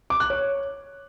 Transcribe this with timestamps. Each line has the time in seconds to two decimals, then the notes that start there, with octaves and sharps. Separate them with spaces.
0.10 D6
0.20 F#6
0.30 C#5